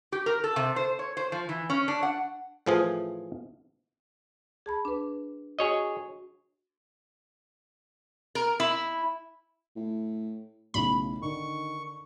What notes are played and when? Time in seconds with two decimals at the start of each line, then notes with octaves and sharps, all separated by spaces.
0.12 G4
0.26 A#4
0.44 A4
0.56 C3
0.76 C5
0.99 C#5
1.17 C5
1.32 F3
1.49 E3
1.70 C#4
1.88 D4
2.03 F#5
2.66 A2 E3 F3 F4 G#4 G#5
4.66 G#4 A5 B5
4.85 D4 B4
5.59 F#4 G#4 C#5 D#5
8.35 A#4
8.60 E4
9.76 A2
10.74 B1 A2 C#3 B5
11.22 D3 D#3 C#6